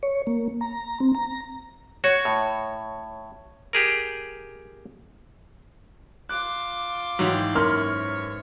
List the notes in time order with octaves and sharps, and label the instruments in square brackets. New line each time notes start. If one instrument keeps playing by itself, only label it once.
[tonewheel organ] C#5
A#3
A#5
C4
A#5
[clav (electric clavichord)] F#4 [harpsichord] C#5
[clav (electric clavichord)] A2
G4 G#4 A#4
[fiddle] F4 D6 [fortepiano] F#6
[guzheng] G#2 E3 G4 [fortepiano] F#3
[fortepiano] F#2 A#3 C6 [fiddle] C#5 [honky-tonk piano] F6